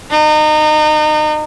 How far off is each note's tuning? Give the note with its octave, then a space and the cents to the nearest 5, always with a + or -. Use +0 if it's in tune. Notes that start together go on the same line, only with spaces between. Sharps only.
D#4 -30